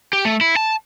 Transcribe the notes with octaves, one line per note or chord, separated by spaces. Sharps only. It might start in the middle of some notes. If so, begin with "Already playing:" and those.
G4
A3
E4
A5